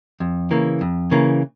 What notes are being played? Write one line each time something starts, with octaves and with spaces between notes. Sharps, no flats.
F2
C#3 E3 A#3
F2
C#3 E3 A#3